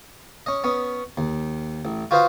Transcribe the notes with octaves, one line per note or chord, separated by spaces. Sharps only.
C#4 D#5
B3 C#4 D#6
D#2
A1
F4 F#4 B4 C5 D#5 F5